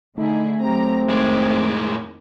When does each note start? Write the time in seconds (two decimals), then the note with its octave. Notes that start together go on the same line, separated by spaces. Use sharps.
0.18 D3 A3 D#4 E4 G#4
0.60 F#3 C4 G4 A#5
1.09 F2 A2 D#3 G#3 D6